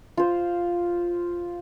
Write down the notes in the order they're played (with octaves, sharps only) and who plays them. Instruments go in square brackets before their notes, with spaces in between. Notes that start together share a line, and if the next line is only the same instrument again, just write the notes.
[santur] F4 C5